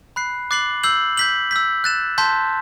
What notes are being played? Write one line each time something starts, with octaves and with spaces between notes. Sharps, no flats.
B5 F#6 C7
D6 F#6 A6 C7 F#7
E6 G6 C7 F#7
G6 B6 F#7
E6 G6 B6
F#6 A6 E7
A5 C6 G6 B6